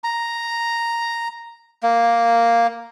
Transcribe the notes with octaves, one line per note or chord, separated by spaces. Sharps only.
A#5
A#3